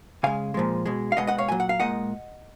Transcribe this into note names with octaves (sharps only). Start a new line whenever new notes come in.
C#3 G#3 F5 G#5
A#2 F3 G#3
B2 G#3
F5
B2 G#3 D#5 F#5
D#5 F#5
C#5 F5
A#2 F#3 G#5
F#5
F5
A#2 G#3 D#5 F#5